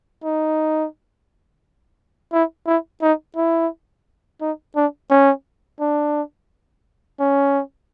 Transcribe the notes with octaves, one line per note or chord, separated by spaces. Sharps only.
D#4
E4
E4
D#4
E4
D#4
D4
C#4
D4
C#4